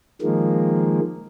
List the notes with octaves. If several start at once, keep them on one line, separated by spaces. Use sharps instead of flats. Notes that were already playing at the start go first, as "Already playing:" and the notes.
D#3 F3 G#3 A#3